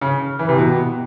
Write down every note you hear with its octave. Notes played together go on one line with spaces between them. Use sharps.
C#3
E3
C3
B2